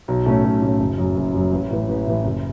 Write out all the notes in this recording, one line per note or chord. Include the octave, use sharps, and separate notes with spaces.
B1
A2 A3 C#4
B1
A2 A3 C#4
F#1
F#2 F#3
F#1
F#2 F#3
A1
A2 E3
A1
A2 E3
F#1